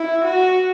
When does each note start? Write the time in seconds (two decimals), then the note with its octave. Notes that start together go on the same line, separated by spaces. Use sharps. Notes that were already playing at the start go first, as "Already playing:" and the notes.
Already playing: E4
0.25 F#4